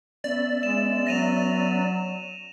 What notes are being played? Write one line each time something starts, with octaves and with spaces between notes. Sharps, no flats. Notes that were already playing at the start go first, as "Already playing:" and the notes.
B3 C#4 D5 E5
G#3 E7
F#3 A#6 D#7 F7